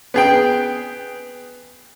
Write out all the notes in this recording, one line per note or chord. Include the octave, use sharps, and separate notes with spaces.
B3 G#4 G5